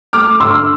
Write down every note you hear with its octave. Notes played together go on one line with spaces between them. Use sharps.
A3 D6 F6
D3 C6 E6